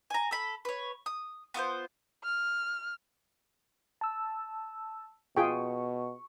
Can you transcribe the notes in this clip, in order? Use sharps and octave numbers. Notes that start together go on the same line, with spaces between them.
G#5 A#5
A4 B5
B4 C#5
D#6
B3 F4 A#4 C5
F6
A5 E6
B2 F4 G#4 G5 C#6